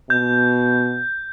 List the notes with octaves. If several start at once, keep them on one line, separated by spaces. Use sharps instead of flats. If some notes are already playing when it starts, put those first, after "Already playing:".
B2 G6